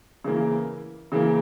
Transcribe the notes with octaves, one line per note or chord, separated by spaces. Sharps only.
C#3 E3 A#3
C#3 E3 A#3